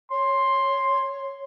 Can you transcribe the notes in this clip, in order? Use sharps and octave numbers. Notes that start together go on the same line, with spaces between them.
C#5 C6